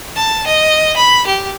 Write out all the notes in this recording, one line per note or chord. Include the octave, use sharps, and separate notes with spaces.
A5
D#5
B5
G4